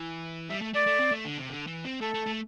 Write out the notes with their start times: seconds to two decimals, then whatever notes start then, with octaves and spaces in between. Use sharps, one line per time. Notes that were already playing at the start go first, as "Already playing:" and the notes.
Already playing: E3
0.50 G3 E5
0.62 A3
0.74 A3 D5
0.87 A3
1.00 C4
1.12 A3
1.25 D3
1.38 C3
1.50 D3
1.67 E3
1.85 C4
2.01 A3 A4
2.14 A3
2.26 A3